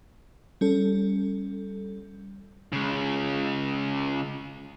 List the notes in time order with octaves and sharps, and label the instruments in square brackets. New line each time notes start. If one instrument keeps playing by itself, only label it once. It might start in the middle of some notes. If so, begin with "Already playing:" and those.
[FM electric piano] G3 C#4 A4
[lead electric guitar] C#3 G#3